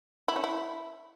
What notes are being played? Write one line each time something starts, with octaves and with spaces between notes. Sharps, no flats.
E4
C#4
E4